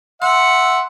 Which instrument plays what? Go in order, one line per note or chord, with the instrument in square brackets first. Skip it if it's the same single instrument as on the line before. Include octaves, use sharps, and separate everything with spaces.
[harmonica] E5 F#5 [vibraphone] C6